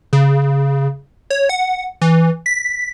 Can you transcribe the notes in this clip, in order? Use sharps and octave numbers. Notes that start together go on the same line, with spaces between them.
C#3
C#5
F#5
E3
B6